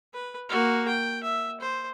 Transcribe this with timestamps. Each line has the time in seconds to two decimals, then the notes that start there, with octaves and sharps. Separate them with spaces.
0.14 B4
0.49 A#3 F#4
0.88 G5
1.23 E5
1.61 C5